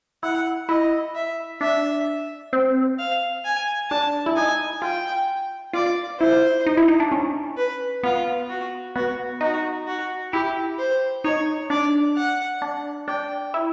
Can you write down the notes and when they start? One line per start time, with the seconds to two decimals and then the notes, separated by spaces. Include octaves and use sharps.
0.23 E4 F#5
0.69 E4 D#5
1.15 E5
1.61 D4 E5
2.53 C4
2.99 F5
3.45 G#5
3.90 D4 A5
4.26 E4
4.36 D#4 G#5
4.82 F4 G5
5.73 F4 D5
6.20 E4 C5
6.66 D#4
6.77 E4
6.88 D#4
7.00 D4
7.11 C#4
7.57 B4
8.03 B3 F4
8.49 F#4
8.96 B3 F#4
9.41 D#4 F#4
9.87 F#4
10.33 E4 G4
10.79 C5
11.24 D#4 C#5
11.70 D4 D5
12.16 F#5
12.62 D4
13.08 D4 G5
13.54 E4